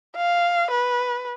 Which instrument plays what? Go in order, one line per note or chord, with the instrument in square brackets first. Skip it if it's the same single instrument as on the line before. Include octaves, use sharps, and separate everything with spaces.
[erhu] F5
B4